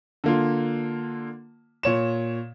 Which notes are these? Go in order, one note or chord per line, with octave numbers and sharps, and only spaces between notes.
D3 A#3 F4
A#2 C#5 E7